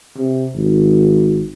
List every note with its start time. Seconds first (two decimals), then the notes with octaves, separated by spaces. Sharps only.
0.17 C3
0.55 G#1